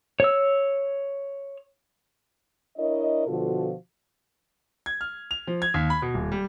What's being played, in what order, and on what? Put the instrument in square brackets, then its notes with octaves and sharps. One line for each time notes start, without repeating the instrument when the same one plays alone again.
[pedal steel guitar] C#5 E6
[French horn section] D4 E4 A#4 C#5 D#5
B2 D3 F3 F4 F#4 A4
[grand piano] G#6
F6
F7
F3
G#6
D#2
B5
B2
D#1
G3